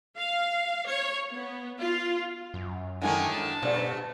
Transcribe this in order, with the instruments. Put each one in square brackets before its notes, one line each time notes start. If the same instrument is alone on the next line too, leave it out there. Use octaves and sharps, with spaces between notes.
[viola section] F5
C#5
B3
F4
[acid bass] F#2
[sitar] D3 D#3 A3 [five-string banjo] G#3 D#4 E4 [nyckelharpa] G#5
[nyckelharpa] A5
[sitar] G2 A3 [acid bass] B2 [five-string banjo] C5 D5 F#5